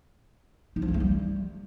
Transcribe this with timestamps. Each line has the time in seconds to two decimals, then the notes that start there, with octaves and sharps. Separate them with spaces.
0.76 D#4
0.82 F3
0.88 C#4
0.94 A3
1.00 G3